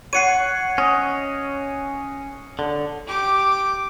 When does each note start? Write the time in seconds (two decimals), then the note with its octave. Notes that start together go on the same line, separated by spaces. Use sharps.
0.13 C#5 F#5 C7 C#7 D#7
0.78 C#4 D#5
2.59 D3
3.07 G4 D6